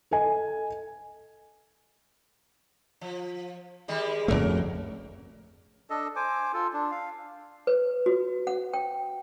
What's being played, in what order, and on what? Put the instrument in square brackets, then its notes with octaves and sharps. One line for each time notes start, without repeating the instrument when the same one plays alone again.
[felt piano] A4 D#5 G#5
[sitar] F3
D#3 G3 G#3
[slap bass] F1 C#2 A3 [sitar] C#4 F#4 A#4
[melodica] D4 A4 D#5
C5 G#5 D6
F4 A4
D4
F5
[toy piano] B4
F#4
F#5
G5